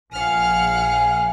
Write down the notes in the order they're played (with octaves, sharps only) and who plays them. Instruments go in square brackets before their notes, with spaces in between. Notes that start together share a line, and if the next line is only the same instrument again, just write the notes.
[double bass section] A#1 [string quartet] F5 F#5 F6 [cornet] G#5